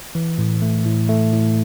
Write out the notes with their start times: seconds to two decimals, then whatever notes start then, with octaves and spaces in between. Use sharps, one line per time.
0.15 E3
0.38 A2
0.62 A3
0.85 A2
1.09 A3
1.33 A2